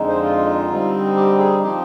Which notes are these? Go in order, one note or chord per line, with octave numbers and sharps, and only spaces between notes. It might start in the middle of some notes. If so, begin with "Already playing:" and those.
Already playing: F2 D3 G#3 D#4
C5
F4
D3 G3 C4 D#4
G4
G#4
F3 C4 D#4 G4